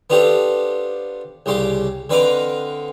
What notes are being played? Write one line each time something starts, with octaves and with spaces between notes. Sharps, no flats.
B3 D4 F4 G4 A4 C5
C2 C#3 G3 C6 D6
D3 C4 B4 D#5 F5 D6